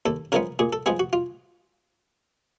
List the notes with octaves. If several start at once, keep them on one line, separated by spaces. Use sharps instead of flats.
D#2 A4
C#3 F3 G#3 B3 A#4
A#2 G#4
A4
F3 G#3 B3 G#4
F#4
F4